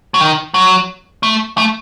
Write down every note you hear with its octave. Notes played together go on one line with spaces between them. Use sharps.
F#3
D#3
F#3
A3
A3